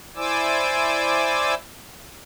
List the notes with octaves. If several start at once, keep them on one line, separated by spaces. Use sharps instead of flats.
E4 C5 D5 G#5 D6 E6